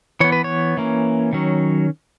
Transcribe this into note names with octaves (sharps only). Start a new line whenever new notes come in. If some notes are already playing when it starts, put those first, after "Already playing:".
E3 B3 C#5
B4
C#5
E3 A#3 C#4
D#3 F#3 C#4